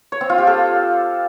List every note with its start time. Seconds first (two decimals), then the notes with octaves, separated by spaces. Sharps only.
0.12 C#5
0.21 C4
0.29 F4
0.38 G4
0.47 A4